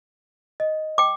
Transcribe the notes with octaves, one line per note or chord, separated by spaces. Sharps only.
D#5
G5 D6